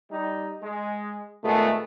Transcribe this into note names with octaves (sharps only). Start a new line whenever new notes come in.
G3 D#4
G#3
G#1 A#2 G#3 A3 B3